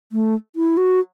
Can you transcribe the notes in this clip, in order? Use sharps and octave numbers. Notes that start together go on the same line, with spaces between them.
A3
E4
F#4